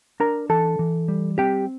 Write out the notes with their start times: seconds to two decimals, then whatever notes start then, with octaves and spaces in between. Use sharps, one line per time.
0.20 D4 A#4 A#5
0.49 E3 A4 A5
0.79 E3
1.08 G3
1.38 C4 G4 G5